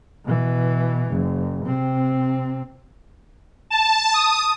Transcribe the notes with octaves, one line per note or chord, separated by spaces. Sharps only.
B2 E3
F#1
C3 C4
A5
D#6